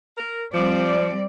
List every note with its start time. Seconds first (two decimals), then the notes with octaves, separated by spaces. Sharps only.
0.18 A#4
0.54 F3 G3 C4 D5